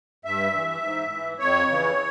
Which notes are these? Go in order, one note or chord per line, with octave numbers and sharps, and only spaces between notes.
G2 E5
E3
G#2
E3
F2 C#5
C#3 E3